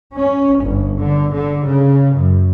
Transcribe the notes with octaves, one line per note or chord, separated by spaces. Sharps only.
C#4
G1
D3
D3
C#3
F#2